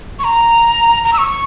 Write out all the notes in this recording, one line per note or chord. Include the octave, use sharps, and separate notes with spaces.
C#6
A#5
A#5
E6
C#6